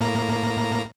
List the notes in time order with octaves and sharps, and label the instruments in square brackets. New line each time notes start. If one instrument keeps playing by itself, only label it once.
[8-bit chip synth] A2 A#3 A#5